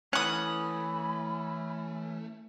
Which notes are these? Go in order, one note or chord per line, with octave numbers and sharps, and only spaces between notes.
E3 A3 C#4 F#5 B5 D#6